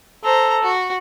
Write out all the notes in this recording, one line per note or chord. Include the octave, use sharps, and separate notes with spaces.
A4 C5 A#5
F#4